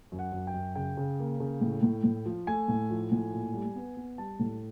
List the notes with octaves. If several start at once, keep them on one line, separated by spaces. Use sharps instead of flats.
F#2
F#5
F#2
G5
F#2
C#3 G5
C#3
A#3
C#3
A2
A2
A2
F3
A3 G#5
A2
F3
A2
A#2
G3
B3
B3
G3 A5
A2